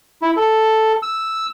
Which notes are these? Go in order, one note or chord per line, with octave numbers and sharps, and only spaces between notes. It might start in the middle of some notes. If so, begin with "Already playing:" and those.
E4
A4
E6